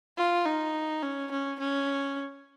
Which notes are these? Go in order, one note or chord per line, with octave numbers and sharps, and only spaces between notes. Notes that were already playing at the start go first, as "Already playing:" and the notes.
F4
D#4
C#4
C#4
C#4